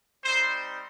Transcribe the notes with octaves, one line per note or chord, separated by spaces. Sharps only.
G3 C4 D#4 C5